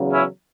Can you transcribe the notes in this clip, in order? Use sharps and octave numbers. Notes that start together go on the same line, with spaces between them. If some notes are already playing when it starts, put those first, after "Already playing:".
Already playing: E2 C#3 F#3
C#4 E4